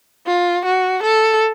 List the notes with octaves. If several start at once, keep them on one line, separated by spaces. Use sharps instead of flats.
F4
F#4
A4